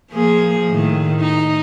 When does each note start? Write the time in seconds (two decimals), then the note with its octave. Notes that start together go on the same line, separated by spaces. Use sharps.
0.12 F3 A#3 G#4
0.69 A2 D#3
1.20 D#4